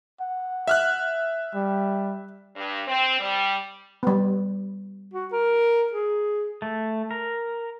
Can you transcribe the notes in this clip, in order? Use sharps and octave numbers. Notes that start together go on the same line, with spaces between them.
F#5
E5 F6 F#6
G3
G2
C4
G3
G3 B3
F#4
A#4
G#4
A3
A#4